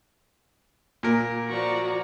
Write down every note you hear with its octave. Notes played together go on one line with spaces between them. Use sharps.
A#2 A#4
F3 F#4 D5 A#5 C#6